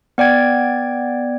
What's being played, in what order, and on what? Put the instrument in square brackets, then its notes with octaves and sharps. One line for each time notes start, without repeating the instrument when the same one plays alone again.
[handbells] B3 D5 G5 G#6